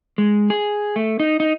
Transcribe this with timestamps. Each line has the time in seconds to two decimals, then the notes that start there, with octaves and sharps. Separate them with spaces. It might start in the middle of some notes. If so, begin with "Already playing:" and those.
0.18 G#3
0.50 G#4
0.96 A3
1.20 D#4
1.40 D#4